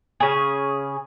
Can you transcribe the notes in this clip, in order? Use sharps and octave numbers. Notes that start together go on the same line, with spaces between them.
C#3 G#4